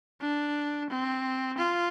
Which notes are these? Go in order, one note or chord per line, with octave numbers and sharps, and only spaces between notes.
D4
C4
F4